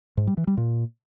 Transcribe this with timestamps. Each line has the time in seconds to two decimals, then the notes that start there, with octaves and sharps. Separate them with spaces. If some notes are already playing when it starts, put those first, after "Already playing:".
0.17 G#2
0.27 G3
0.37 E3
0.47 G3
0.57 A#2